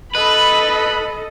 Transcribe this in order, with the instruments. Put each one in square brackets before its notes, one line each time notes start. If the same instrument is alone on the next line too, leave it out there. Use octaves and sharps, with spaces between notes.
[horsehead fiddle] A4 D#5 [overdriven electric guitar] B4 [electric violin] B5